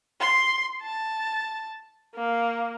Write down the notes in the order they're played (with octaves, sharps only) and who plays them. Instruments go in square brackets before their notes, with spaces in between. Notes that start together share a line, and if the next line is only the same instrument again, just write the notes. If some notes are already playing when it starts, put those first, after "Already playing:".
[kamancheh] C6
A5
A#3